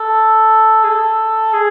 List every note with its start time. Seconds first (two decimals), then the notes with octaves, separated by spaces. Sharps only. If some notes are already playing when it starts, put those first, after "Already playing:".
Already playing: A4
0.84 G#4
0.90 A4
1.53 G#4